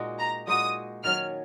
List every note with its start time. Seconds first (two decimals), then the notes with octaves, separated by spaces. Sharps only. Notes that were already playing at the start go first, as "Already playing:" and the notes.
Already playing: A#2 G#3 D#4 F#4
0.19 A#5
0.47 A#2 G#3 D#4 F#4 D#6
1.04 D#3 F#3 C#4 F6